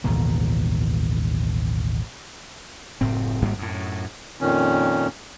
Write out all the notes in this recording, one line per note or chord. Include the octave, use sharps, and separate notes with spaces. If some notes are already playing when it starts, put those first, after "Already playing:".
A1 D#2 B2 D#3
F#1 A2 C4
G#1 G#2 G3 A#3
F#2 A2
F2 A#2 D#3 C#4